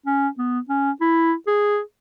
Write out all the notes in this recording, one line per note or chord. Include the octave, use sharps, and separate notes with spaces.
C#4
B3
C#4
E4
G#4